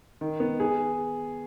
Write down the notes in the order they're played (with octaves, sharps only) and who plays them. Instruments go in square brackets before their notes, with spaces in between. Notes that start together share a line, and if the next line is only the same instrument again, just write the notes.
[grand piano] D#3
B3
G#4